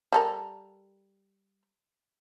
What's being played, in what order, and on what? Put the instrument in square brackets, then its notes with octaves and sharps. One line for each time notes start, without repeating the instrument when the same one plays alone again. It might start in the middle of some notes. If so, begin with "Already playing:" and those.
[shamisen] G3 A4 A#4